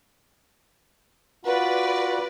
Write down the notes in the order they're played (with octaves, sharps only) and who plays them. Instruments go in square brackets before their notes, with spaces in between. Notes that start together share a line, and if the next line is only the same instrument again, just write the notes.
[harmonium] F4 F#4 F#5 [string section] B4 D5